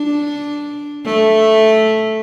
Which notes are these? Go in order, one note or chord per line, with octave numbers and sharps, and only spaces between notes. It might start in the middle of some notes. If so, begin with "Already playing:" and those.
Already playing: D4
A3